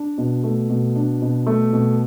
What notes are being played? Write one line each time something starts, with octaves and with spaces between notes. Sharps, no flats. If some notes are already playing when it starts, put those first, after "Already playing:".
Already playing: D4
B2
A3
B2
D4
B2
A3
B2